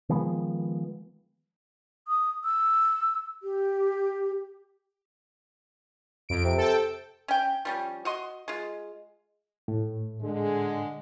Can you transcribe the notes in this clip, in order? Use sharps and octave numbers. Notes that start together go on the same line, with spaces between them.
D#3 F3 G#3 B3
D#6
E6
G4
F2 D7
C3
A4 G5
C#4 G5
F3 G3 C#4
F#4 D#5 C6
G#3 F4
A2
D3 G#3